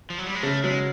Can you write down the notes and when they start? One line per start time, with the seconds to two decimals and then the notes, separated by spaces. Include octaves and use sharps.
0.10 F3
0.19 F#3
0.26 G3
0.35 G#3
0.43 C#3 A3
0.64 F#3 G#3